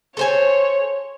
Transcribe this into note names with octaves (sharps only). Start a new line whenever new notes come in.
A4 C5 C#5 G#5